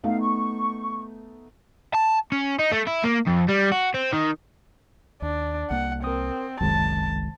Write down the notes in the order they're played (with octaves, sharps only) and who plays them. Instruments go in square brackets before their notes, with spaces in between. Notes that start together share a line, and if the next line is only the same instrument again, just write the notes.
[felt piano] A3 B3 D#4 [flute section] F5
[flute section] C#6
[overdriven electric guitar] A5
C#4
D#4
A3
E4
A#3
F2
G3
F#4
C4
D#3
[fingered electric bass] D#2 [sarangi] D4
[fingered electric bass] C2 A#3 [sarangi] F#5
[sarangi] C4 [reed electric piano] A#4 D#6
[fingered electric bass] F#1 C2 [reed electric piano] F#2 D#3 G#3 [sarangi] A5